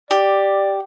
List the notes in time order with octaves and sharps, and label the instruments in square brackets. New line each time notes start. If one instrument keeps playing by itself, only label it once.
[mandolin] G4 [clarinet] D5